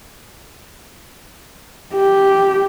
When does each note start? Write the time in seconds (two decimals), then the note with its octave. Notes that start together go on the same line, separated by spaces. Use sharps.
1.94 G4